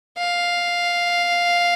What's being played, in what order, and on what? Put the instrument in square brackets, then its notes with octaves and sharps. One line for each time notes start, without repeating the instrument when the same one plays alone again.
[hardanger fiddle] F5